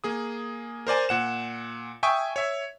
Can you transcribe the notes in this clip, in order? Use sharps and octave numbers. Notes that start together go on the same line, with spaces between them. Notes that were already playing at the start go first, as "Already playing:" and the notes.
A#3 G#4 D#6
A#4 C5 D5 G#5
A#2 F#5 E7
E5 G5 G#5 C#6 D#6
C#5 E5